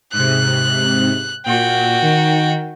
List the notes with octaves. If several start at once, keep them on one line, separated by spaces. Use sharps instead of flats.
G#2 C3 F#6
A#2 F#4 G5
D#3